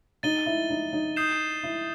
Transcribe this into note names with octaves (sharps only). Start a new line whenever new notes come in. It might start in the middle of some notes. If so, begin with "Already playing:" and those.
D#4 A6 D#7 G7
E4
D#4
D#4
D#6 G6 C7 E7
E4